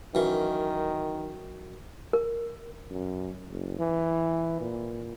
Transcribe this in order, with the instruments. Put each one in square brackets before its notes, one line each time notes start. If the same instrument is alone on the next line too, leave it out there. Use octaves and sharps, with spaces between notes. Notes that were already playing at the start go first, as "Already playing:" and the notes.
[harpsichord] F#2 E3 [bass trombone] D#3
[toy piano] A#4
[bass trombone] F#2
F#1
E3
A#2